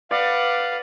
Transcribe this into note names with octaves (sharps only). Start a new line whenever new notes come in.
B4 D5 F5 F#5